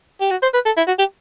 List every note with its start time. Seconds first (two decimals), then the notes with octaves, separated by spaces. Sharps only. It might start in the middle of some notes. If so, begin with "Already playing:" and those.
0.21 G4
0.31 F#4
0.42 C5
0.54 B4
0.66 A4
0.77 E4
0.88 F#4
0.99 G4